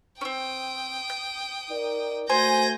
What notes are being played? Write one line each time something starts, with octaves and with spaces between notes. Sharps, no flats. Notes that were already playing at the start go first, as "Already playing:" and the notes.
C4 C#4 G5 D#6
G6
D#4 A#4 D5
A3 F#4 C5 G#5 G6 A#6